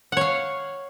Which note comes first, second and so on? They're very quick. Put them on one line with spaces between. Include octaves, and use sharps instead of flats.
F#5 C#5 F5